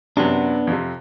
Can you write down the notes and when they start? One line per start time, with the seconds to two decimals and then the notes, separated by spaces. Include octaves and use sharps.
0.17 F#2 C3 B3 D4
0.67 F2 C3